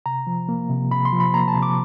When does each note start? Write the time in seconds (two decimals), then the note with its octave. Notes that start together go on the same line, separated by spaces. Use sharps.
0.06 C3 A#5
0.27 F3
0.49 A#3
0.70 C3
0.91 C3 B5
1.05 C6
1.12 F3
1.20 B5
1.34 A#3 A#5
1.48 A5
1.55 C3
1.62 D6